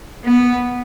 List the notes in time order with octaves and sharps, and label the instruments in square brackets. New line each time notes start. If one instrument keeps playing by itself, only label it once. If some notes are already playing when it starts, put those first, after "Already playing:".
[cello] B3